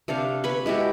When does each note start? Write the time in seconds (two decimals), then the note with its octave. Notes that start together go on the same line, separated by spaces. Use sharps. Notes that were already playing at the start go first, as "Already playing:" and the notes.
0.08 C3 D4 A4 F5
0.44 B4 C#5 B5 C#6
0.66 G#3 E4 F#4 G4